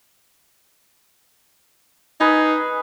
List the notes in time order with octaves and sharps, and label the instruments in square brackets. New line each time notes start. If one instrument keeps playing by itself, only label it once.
[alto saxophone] D#4 [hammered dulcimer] G#4 B4